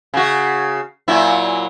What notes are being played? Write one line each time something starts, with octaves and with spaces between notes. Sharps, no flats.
C#3 F#4
A#2 F#3 E4